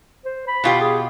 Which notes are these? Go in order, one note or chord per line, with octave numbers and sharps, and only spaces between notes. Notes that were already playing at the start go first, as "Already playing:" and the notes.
C5
B5
B2 F4 G4
G#4